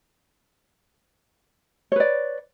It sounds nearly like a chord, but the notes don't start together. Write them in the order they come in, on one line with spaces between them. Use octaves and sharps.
C#5 B4 D5